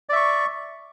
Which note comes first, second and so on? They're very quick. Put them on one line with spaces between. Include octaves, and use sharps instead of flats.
D5 E5 C#6